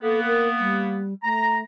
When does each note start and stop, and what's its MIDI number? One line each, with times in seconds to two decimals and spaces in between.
0.03 1.02 58
0.03 1.02 59
0.03 0.20 69
0.26 0.47 70
0.59 1.13 55
1.23 1.63 57
1.23 1.57 82